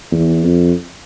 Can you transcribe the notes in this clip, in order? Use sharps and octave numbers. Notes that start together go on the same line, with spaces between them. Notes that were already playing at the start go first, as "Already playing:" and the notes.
E2
F2